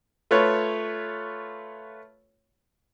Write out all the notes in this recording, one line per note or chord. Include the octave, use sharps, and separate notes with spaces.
A3 F4 B4 C#5